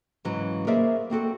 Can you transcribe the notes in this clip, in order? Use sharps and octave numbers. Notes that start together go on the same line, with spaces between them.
G#2 C#3 E3 F#3
A#3 G#4 A#4 C5 D5 E5
A#3 C4 F#4 A4